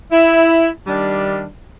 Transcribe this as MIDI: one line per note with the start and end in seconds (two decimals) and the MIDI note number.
0.11 0.69 64
0.86 1.44 51
0.86 1.44 55
0.86 1.44 62